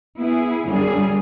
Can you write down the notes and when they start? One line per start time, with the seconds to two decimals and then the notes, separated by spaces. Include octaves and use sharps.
0.18 B3 E4 G#4
0.66 F#2 D3 G3 G#4